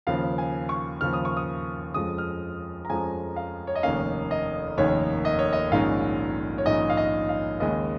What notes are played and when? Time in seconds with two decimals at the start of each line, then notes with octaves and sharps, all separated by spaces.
0.07 D#2 C#3 F3 F5
0.38 G#5
0.69 C#6
1.01 D#2 C#3 F3 F6
1.13 D#6
1.25 C#6
1.37 D#6
1.94 F2 F3 G#3 C#4 D#6
2.18 F6
2.85 A#5
2.90 F2 F3 G#3 C#4 G#5
3.36 F5
3.67 C#5
3.75 D#5
3.83 F1 D#2 D#3 A#3 C#4 F5
4.31 D#5
4.77 F1 D#2 D#3 A#3 C#4 C#5
5.25 D#5
5.39 C#5
5.53 D#5
5.71 A#1 G#2 D#3 G#3 C#4 F5
6.58 C#5
6.66 A#1 G#2 D#3 G#3 C#4 D#5
6.90 F5
6.97 D#5
7.29 F5
7.60 D#2 C#3 G#3 C#4 D#5